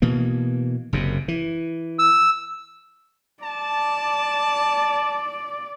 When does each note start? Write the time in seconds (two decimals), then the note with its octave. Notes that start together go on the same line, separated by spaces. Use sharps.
0.02 B2 E3 A#3
0.93 F#1 F#2 C3
1.28 E3
1.99 E6
3.43 D5 A5